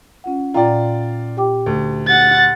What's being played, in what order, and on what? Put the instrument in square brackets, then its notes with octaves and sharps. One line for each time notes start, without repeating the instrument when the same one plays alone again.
[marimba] C#4 F4 F#5
[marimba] A#2 G5 A#5 [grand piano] F4 D5
[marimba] G4 G5 D6
[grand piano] D2
[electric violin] F#5 A6